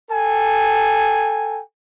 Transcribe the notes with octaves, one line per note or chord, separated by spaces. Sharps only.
A4 G5 G#5